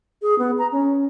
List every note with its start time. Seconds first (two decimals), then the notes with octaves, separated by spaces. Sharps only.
0.22 G#4
0.39 B3
0.58 A#5
0.72 C#4